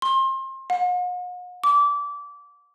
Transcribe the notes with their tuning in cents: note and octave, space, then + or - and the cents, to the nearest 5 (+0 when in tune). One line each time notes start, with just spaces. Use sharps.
C6 +30
F#5 -45
D6 -20